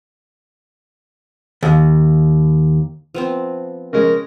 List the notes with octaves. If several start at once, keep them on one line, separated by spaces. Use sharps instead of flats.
D#2
F3 B3 C4
C#3 G#3 A#4